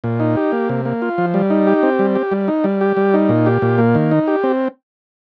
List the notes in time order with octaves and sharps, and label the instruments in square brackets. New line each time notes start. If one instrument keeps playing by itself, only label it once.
[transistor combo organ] A#2
D#4
G4
A#3
C3
A#3
F4
F3
G3
D#4
G4
C4
G3
G4
G3
D#4
G3
G4
G3
D#4
A#2
G4
A#2
A#3
D#3
D#4
G4
C4